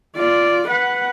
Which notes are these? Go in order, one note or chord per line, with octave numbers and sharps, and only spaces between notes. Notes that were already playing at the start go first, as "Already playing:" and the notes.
F4 D5
B4 F#5